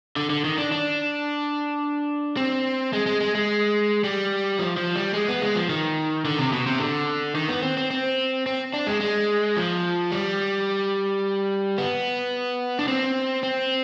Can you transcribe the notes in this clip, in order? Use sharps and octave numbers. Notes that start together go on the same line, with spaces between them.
D3
D3
D#3
D4
D4
C4
G#3
G#3
G#3
G#3
G3
F3
F3
G3
G#3
B3
G#3
F3
D#3
D3
C3
B2
C3
D3
D#3
B3
C4
C4
C4
C4
D4
G#3
G#3
F3
G3
B3
D4
C4
C4